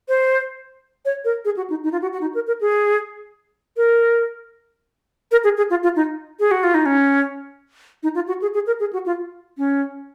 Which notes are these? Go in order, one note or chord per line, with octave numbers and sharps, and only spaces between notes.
C5
C#5
A#4
G#4
F#4
D#4
D#4
F4
F#4
F#4
D#4
A#4
A#4
G#4
A#4
A#4
G#4
G#4
F4
F4
D#4
G#4
F#4
F4
D#4
C#4
D#4
F4
F#4
G#4
G#4
A#4
G#4
F#4
F4
C#4